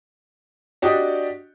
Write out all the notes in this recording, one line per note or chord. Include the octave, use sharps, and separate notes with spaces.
D4 F#4 G4 D5 D#5